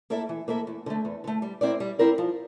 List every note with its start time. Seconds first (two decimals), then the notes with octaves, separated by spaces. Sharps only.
0.10 A#3 E4 A4 E5
0.29 E3
0.48 A#3 E4 A4 E5
0.67 E2
0.86 D3 A3
1.05 E2
1.24 D3 A3
1.42 G3
1.61 C4 E4 A#4 D5
1.80 G3
1.99 C4 E4 A#4 D5
2.18 F3